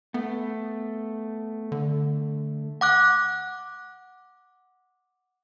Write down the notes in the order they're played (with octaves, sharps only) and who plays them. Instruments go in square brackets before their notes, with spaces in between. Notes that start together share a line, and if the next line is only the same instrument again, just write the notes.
[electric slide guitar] A3 [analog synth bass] B3
[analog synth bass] D3
[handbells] F#5 D6 F#6